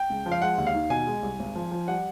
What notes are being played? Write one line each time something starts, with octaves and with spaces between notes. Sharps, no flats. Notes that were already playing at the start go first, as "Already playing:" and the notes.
Already playing: G5
C#2
F3
F5
G#3 F#5
D#2
F5
D#3
B2 G#5
G#3
C2
G#1
F3
F3
G3 F#5